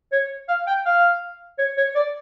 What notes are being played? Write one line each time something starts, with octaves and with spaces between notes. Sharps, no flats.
C#5
F5
G5
F5
C#5
C#5
D5